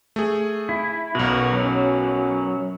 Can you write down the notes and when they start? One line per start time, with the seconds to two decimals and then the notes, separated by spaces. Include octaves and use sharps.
0.16 A3 G#4
0.69 E4
1.15 B1 F#2 B2 B3 F#4 A#4
1.53 F#2 F#3 C#4